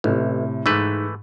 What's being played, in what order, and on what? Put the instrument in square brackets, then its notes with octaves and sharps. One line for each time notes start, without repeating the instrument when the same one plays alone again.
[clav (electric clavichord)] A1 [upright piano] A2 C3
[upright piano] G#2 [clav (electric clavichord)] E3 A3 B4